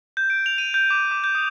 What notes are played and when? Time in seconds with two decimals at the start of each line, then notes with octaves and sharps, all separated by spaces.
0.17 G6
0.30 D7
0.46 F7
0.58 D#7
0.74 G6
0.90 D6
1.11 D6
1.24 G6
1.35 D#6